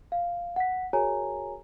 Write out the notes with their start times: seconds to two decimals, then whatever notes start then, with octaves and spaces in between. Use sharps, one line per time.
0.12 F5
0.56 F#5 B6
0.93 F#4 G#4 A#4 C#5 G#5 A#5